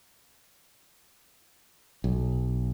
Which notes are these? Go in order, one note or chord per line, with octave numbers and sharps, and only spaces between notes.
B1